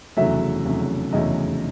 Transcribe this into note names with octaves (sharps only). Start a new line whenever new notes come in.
F1 E2 C#3 F#3 A3 E5
F1 E2 C#3 F#3 A3
F1 E2 C#3 F#3 A3 D#5